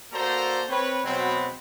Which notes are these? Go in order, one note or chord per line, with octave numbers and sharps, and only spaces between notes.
A#3 F#4 A4 C5 D5 A#5
C4 B4 C#5
B2 F#3 G#3 B3 C4